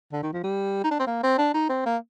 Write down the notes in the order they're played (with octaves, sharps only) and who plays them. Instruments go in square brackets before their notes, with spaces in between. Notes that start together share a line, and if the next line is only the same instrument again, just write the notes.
[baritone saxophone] D3
D#3
F3
G3
D#4
D4
C4
A#3
C4
D4
D#4
C4
A#3